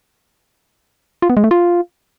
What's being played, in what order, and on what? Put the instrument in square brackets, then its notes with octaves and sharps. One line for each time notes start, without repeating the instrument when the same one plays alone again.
[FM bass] F4
B3
G#3
A3
F4